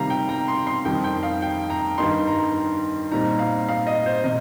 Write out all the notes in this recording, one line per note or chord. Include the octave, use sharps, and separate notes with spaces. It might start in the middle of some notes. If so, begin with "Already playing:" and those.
Already playing: C3 D#3 G3 F5 A#5
G5
A#5
C6
C6
F2 D#3 G3 G5
G5
F5
G5
A#5
G2 D#3 G3 D#4 C6
A#5
A#2 G3 C4 D#4 A#5
F5
F5
D#5
C5
C3 D#5